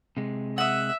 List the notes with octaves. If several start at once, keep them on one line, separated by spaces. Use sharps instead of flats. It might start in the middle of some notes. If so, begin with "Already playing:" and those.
C3 G#3
E5 F#5 D#6